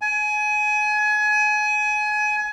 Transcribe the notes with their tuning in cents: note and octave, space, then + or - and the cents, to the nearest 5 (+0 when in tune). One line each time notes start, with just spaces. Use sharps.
G#5 +25